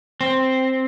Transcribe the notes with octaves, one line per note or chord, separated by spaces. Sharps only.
C4